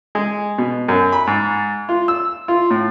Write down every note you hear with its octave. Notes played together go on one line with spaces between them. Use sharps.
G#3
B2
F#2
B5
G#2
F4
E6
F4
A2